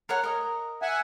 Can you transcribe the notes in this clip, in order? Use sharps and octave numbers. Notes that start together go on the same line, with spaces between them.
A#4 C#5 F#5
A#4 D#5
E5 F#5 G#5